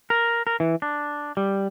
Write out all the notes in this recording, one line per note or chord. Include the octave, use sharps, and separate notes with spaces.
A#4
A#4
E3
D4
G3